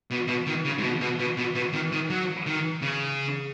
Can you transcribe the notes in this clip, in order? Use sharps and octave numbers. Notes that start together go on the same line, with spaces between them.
B2
B2
D#3
C#3
G#2
B2
B2
B2
B2
B2
D#3
D#3
F#3
D#3
C#3